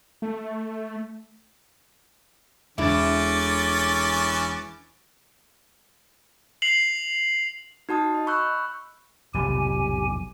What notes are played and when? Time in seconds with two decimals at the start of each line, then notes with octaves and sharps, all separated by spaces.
0.22 A3
2.78 E1 D3 E3 C#4 E4 D6 A6
6.62 C7 F7 F#7
7.89 D#4 F#4 A5 D#6
8.14 D#5
8.27 B5 C#6 E6 F#6 G6
9.34 F1 B1 A2 G4 G#5